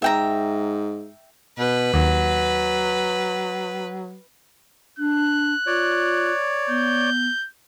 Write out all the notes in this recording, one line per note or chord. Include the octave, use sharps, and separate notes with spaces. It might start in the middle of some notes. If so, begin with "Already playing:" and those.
G#2 E5 G5 A#5
B2 B4
D#2 F#3
D4 F#6
F4 C#5 D5
B3 G6